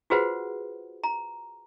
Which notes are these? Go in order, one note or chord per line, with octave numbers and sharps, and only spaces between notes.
F4 F#4 G#4 B4 C5 F#5
A#5